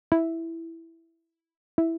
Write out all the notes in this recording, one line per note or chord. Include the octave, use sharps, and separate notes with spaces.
E4
E4